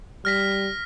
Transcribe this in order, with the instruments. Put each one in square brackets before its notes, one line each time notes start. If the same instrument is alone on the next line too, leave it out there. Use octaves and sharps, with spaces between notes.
[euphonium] G3 [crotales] F6 A#6 B6